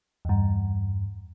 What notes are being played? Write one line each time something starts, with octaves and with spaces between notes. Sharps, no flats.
E2 G2